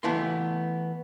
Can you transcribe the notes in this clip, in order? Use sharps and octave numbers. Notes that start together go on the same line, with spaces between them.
E3 A3 B3 E4 F4 C6